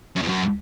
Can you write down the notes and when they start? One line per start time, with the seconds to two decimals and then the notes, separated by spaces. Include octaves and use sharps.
0.16 F#2
0.22 E2
0.28 F#2